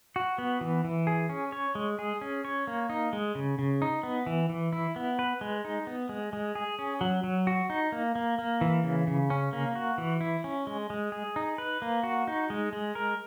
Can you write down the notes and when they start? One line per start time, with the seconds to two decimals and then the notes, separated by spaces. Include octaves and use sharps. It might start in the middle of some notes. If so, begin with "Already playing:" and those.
0.16 F#4
0.38 B3
0.61 E3
0.85 E3
1.07 G#4
1.29 C#4
1.52 C#5
1.75 G#3
1.99 G#4
2.21 C#4
2.45 C#5
2.67 A#3
2.90 D#4
3.13 G#3
3.35 C#3
3.59 C#3
3.82 D#4
4.03 B3
4.26 E3
4.49 E3
4.73 E4
4.96 B3
5.19 B4
5.41 G#3
5.65 D#4
5.87 B3
6.09 G#3
6.33 G#3
6.55 G#4
6.79 C#4
7.01 F#3
7.24 F#3
7.47 F#4
7.70 D#4
7.92 A#3
8.15 A#3
8.38 A#3
8.61 E3
8.83 C#3
9.07 C#3
9.30 C#4
9.53 A#3
9.75 F#4
9.98 E3
10.21 E4
10.44 C#4
10.67 G#3
10.90 G#3
11.12 G#4
11.36 D#4
11.58 B4
11.82 A#3
12.03 F#4
12.28 D#4
12.50 G#3
12.73 G#3
12.95 A#4